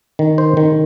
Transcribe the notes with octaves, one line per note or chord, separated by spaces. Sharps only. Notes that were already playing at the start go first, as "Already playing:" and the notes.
D#3
C5
D#3